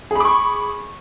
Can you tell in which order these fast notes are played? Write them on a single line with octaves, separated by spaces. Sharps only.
G#4 B5 D6 C#6